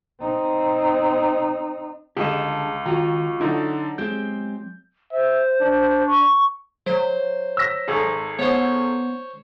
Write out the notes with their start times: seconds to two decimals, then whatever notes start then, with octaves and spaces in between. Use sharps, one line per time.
0.21 C4 D#4
2.17 C#2 D3 G3 G4 G#4 D#5 A5
2.86 D#3 F4 F#4 A#5
3.41 D3 F#3 D#4 E4 A4
3.98 G#3 C4 G4 G6
5.12 C5 E5
5.61 D4
6.07 C#6
6.86 F#3 C5
7.57 E6 A#6 B6
7.88 G#1 G#4 A4
8.39 B3 C5 C#5